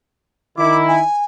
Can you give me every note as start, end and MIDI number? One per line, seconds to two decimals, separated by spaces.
0.57 1.00 51
0.57 1.00 64
0.57 0.76 86
0.88 1.24 80